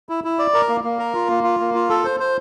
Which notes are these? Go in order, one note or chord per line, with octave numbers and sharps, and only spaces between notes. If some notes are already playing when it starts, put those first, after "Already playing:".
E4
E4
D5
A#4
A#3
A#3
A#4
F4
A#3
F4
A#3
F4
A4
C5
C5